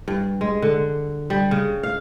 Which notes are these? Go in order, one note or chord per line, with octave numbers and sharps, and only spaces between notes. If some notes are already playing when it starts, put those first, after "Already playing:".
G2
G#3
D3
G3
C#3
F5